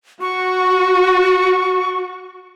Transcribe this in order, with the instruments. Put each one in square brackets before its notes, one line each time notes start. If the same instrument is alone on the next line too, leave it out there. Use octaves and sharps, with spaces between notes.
[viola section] F#4 [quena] C#6